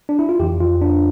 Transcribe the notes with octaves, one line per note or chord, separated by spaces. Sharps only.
D4
E4
F4
F2 E3 G4
F4
D4